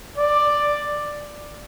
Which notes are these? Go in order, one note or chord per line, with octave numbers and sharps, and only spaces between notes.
D5